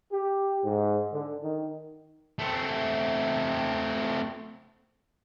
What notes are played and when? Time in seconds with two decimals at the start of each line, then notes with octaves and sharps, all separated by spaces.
0.12 G4
0.65 G#2
1.13 D3
1.43 D#3
2.39 A3 C4